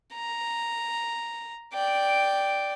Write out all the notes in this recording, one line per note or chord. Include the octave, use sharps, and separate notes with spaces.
A#5
D5 G5